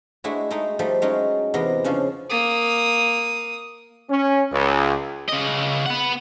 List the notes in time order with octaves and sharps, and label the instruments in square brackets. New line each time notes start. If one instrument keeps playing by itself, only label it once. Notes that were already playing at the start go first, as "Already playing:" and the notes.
[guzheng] G#3 A3 D4 E4 F#4
G#3 A3 D#4
F3 G3 A3 D#4
F#3 G#3 A3 C#4 D#4 F#4
E2 C3 B3 A#4 D#5
C#3 F3 C#4 D4
[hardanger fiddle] A#3 D#6
[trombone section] C#4
C#2
[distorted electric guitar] C#3 D#5
B3 F#5